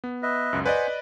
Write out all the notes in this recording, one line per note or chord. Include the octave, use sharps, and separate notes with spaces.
B3
B4 D#5 E5
C#2 F#2
B4 C5 D5 D#5 F#5 G#5